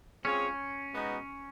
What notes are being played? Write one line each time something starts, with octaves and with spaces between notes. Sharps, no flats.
G#3 C4 C#4 F4 G#4 C#5
B2 G#3 B3 D#4 F#4